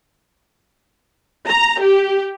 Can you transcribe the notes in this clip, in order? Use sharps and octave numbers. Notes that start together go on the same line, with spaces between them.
A#5
G4